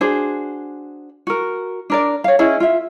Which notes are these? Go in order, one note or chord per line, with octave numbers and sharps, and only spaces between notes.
D4 F#4 G#4 C5
F#4 A#4
D4 A#4 D5
C#5 F5
C#4 E4 G#4 D#5
F4 E5